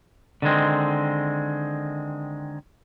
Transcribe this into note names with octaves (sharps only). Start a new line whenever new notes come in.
D3 D#3 G#3 C4